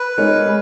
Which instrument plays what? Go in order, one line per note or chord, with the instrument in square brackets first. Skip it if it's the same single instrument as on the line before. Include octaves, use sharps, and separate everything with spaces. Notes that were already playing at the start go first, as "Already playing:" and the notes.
Already playing: [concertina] B4
[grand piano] G#3 B3 D#4 A#4 C#5
G#3